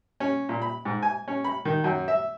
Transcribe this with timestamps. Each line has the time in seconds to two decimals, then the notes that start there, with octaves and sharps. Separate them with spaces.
0.20 C#4
0.49 A#2
0.62 B5
0.85 G#2
1.03 G#5
1.28 C#4
1.44 B5
1.65 D#3
1.84 F#2
2.08 E5